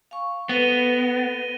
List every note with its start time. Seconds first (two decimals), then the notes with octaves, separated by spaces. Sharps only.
0.11 F5 G#5 C#6
0.49 B3 A4 B4 C5 A#6 D#7 G7